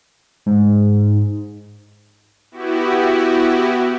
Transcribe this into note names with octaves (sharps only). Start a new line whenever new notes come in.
G#2
B3 E4 F#4 G4